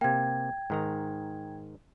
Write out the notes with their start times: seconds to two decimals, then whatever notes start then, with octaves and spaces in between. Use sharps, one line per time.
0.01 C3 A#3 G5 G#6
0.70 G#2 D#3 A#5